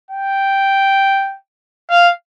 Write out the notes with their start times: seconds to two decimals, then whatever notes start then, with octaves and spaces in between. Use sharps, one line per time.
0.11 G5
1.90 F5